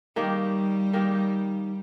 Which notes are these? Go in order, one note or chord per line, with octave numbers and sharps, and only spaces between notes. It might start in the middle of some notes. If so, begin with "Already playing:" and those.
D#3 G3 A#3 D#4 G4
D#3 A#3 D#4 G4